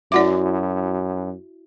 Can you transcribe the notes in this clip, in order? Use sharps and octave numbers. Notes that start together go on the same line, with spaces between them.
F#2 E4 F#4 D5 E5 F#5 D6